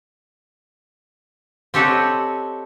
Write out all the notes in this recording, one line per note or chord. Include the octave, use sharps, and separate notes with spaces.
C4 G4 A4 C#5 D#5 F#5